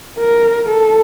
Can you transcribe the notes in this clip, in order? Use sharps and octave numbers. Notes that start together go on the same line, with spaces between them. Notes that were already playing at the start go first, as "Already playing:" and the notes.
A#4
A4